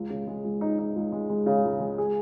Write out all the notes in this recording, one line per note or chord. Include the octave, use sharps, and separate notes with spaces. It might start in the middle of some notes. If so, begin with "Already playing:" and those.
Already playing: C#2
C#3
G#3
C#2
D#4
D#4
C#2
G#3
G#3
C#3
C#2
G#3
G#4